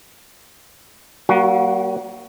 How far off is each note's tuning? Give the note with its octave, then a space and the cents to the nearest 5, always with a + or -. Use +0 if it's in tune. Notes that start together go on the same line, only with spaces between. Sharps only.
G3 -45 A#3 +15 F#4 +0